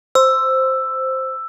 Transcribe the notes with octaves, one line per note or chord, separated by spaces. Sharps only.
C5 E6